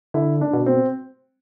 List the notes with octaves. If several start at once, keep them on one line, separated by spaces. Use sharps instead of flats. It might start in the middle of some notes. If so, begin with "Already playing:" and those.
D3 E4
D4
B2
C4